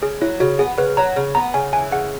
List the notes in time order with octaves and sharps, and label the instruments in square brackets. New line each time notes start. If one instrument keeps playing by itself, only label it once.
[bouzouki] C#3 [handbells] G#4
[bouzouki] F#3 [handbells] E4
[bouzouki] C#3 [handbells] F#4
[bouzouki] B3 [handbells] G#4
[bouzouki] C#3 [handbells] B4
[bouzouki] F#3 [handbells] A#5
[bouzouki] C#3
[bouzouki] B3 [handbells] A#5
[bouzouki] C#3 [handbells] G#5
[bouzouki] E3 [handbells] G#5
[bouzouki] C#3 [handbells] F#5